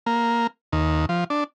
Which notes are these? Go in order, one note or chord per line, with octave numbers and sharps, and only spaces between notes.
A#3
D#2
F3
D4